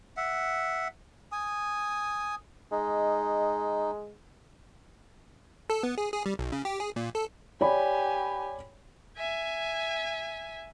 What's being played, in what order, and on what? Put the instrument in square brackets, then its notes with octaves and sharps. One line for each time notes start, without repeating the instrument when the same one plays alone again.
[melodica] E5 F#5
G#5 D#6
[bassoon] G#3 [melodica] D#4
[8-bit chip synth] A4
B3
G#4
G#4
G3
B1
C#3
G4
G#4
A#2
A4
[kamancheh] G4 G#5 [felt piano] C#5 D5 B5
[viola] E5 G#5